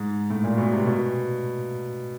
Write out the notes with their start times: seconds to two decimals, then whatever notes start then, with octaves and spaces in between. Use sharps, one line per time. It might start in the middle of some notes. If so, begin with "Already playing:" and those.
Already playing: G#2
0.30 A2
0.44 A#2
0.58 B2
0.73 C3
0.87 B2